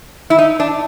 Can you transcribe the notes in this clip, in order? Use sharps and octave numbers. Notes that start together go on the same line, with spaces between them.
E4
D#4
D4